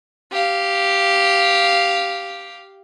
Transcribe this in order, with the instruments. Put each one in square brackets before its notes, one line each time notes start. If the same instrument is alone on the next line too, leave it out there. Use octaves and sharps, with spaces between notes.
[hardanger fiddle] G4 F5